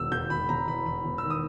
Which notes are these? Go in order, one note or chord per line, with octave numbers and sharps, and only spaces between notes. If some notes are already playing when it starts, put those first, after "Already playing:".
Already playing: E1 D#3 E6
E1 G6
E1 B5
E1 A#5
E2 B5
E2 B5
E1
D#3 E6
D#6